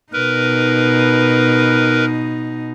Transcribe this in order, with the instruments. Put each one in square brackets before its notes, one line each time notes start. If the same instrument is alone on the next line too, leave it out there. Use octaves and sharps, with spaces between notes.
[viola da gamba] B2 D#4 [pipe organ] A#4 B4